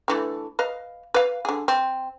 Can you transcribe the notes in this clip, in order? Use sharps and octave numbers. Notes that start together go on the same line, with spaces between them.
D3 E3 A3
B4 D#5 F5
B4 F5
D3 G#4
C4